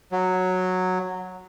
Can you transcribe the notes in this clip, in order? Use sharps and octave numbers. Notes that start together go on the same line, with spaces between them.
F#3